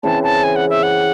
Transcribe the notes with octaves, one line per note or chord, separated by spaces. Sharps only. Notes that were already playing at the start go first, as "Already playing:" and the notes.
C#3 E3 C4 E4 A5
A5
G#5
F#5
E5
F#5